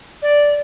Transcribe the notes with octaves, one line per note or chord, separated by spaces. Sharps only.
D5